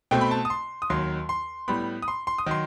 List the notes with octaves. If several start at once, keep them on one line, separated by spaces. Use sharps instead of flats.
B2 A3 C4 G5
B5
A5
D#6
C6
D#6
D#2 D#3 F#3 C6
C6
A2 G3 B3 B5
D#6
C6
C6
D#6
D#3 F#3 C6